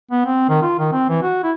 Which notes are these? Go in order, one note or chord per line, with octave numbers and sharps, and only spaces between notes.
B3
C4
D#3
F4
D#3
C4
E3
F#4
E4